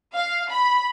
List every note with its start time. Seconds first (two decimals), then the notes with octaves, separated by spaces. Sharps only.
0.14 F5
0.50 B5